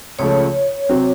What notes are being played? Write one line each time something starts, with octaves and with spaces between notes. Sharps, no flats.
C#2 C#3 F3 A3 C#5
C3 F#3 C4